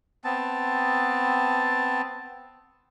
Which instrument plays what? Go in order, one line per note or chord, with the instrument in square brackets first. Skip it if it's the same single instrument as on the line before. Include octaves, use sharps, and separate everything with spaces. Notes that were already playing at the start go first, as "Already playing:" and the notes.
[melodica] B3 C4 A5